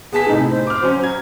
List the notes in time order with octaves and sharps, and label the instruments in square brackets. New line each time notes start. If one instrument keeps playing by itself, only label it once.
[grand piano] B3 A5 B6 [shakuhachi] G#4
[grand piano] A2 C3 [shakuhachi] D#4
[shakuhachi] C5
[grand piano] D6 F6
F#3 C#4
A#5 G#6